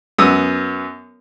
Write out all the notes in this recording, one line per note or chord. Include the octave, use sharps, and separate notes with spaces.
F#2 B3 D#6 E6